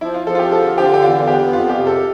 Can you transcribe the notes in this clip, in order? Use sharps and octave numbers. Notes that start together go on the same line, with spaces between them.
F3 E4
F4
F3 A4
F4
G4
D3 A4
D3 G4
F4
G4
E2 F4
B3 G4
F2 F4
G4
C3
A4